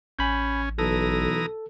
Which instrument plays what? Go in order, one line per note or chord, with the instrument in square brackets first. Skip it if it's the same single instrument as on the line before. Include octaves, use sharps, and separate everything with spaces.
[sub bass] A1 [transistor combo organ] C#4 [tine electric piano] G#5 B5 G6
[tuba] B1 [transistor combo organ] E3 A#5 D#6 [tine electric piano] A4